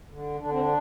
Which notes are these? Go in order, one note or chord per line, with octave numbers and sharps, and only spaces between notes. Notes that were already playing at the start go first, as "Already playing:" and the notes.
D3
D3 D4
C4
D4